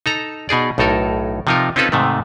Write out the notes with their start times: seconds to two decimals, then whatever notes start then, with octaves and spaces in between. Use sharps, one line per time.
0.06 D#4 A4 A#5
0.49 B2 D#4 G#4 D5
0.78 B1 A2 D#4 A4 A#4
1.47 C3 F3 D#4 F4 A#4
1.76 C4 C#4 D#4 F4 A4 B4
1.92 G#2 C3 D#3 A3